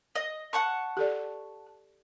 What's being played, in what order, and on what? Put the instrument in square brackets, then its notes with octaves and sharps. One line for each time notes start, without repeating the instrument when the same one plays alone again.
[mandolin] D#5
F#5 A5 C#6
[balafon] G4 A4 D5